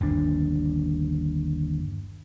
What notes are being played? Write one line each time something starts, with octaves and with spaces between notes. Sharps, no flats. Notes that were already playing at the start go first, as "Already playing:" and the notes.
G1 D#2 D4